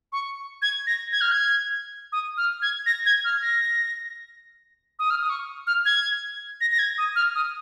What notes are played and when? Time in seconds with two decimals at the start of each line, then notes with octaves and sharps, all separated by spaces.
0.13 C#6
0.62 G#6
0.87 A#6
1.12 G#6
1.21 F6
1.32 G#6
2.12 D#6
2.37 F6
2.62 G#6
2.86 A#6
3.06 G#6
3.24 F6
3.42 A#6
4.99 D#6
5.10 F6
5.21 D#6
5.30 C#6
5.67 F6
5.85 G#6
6.61 A#6
6.72 A#6
6.79 G#6
6.98 D#6
7.16 F6
7.35 D#6